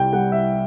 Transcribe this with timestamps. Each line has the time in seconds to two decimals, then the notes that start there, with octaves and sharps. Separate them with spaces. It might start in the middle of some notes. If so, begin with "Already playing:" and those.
Already playing: C2 G5
0.13 G3 F#5
0.32 E5